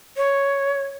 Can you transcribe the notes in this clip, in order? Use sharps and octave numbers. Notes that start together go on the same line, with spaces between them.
C#5